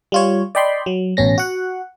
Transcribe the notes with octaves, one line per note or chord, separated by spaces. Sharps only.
G3 F4 C#5
D5 D#5 G5 B5 C6
F#3
A1 B2 C#4 A#6
F#4 F#5